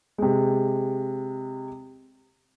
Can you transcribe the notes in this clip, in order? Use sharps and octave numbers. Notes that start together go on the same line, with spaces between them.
C3 G#3